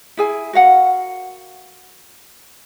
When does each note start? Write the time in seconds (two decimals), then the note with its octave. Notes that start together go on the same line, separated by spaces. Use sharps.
0.17 E4 G#4 G#5
0.53 F#4 A#4 F5 F#5